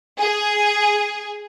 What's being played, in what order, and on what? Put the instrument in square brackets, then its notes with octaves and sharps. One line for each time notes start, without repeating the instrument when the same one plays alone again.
[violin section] G#4